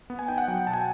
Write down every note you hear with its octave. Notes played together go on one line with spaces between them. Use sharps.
B3
G#5
D#4 G5
F#5
F#3 G5
B2 A5
G#5